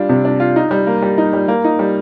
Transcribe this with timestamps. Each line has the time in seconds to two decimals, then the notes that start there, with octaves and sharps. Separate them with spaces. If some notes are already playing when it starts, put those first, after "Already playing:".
Already playing: G3 D4 F4
0.09 C3
0.25 D4
0.40 F4
0.56 D#4
0.71 G3
0.87 A#3
1.02 G3
1.18 D#4
1.33 G3
1.48 A#3
1.64 D#4
1.79 G3